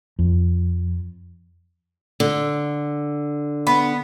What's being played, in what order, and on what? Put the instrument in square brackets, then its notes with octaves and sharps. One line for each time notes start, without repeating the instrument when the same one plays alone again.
[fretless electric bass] F2
[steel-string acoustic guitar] D3
[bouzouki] B3